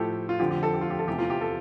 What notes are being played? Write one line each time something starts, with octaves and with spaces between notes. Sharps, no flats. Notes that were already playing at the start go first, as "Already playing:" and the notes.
Already playing: A2 F3 G4 A4
F4
F2 D3 F3 G4
G4
A4
G4
F4
G4
A4
E2 C3 E3 G4
F4
G4
A4